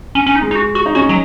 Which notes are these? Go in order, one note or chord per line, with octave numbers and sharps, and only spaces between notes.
C#4
C#4
D#4
G#3
D#4
F#4
F#4
D#4
C#4 F#4
F#3